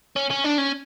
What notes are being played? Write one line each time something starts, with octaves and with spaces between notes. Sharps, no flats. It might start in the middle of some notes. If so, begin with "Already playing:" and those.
C#4
C#4
D4
C#4